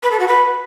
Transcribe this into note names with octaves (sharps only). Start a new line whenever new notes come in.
B4
A4
F#4
B4